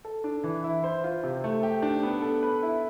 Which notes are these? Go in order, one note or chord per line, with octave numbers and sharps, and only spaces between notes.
A4
D4
E3
E4
C5
F4
C3
A3
G4
D4
B3
A4
B4
E4